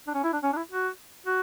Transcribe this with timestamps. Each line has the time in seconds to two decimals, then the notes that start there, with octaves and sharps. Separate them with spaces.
0.07 D4
0.14 C#4
0.24 E4
0.33 D4
0.43 C#4
0.53 D4
0.57 E4
0.71 F#4
1.27 F#4